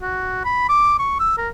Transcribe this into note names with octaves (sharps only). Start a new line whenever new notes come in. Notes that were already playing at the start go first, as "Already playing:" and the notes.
F#4
B5
D6
C#6
E6
A#4